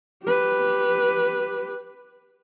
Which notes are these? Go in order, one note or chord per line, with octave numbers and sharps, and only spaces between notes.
G4 B4